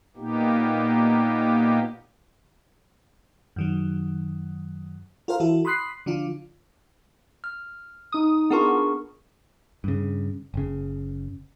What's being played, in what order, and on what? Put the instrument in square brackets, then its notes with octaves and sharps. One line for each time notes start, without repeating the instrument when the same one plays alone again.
[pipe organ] A#2 A#3 B3 D#4 G4
[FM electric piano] F#2 D#3 F#3
F4 A4 A#4 C5 F5
E3 E4 F#4 A4
B5 C6 D#6 F#6 B6 C7
D3 F3 D4 F4
[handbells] F6
[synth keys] D#4 D#6
[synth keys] B3 D4 F4 [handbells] G#4 A#4 C#6
[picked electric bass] G2 C#3
F#1 C#3